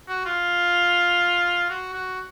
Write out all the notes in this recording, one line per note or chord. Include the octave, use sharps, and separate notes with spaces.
F#4
F4
F#4
F#4